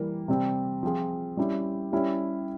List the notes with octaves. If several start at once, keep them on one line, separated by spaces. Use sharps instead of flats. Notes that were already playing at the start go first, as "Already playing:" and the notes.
Already playing: E3 G3 A#3
C3 G3 C4
F3 C4 F4 G#4
G3 C#4 E4 G4
G3 C#4 E4 G4